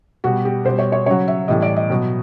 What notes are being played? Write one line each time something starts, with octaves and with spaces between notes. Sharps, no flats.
B2 G3 F#4
G4
B2 G3 C5
C#5
C#5
C#3 F#3 C#5
E5
A2 E3 G3 D#5
D5
D#5
B2 F#3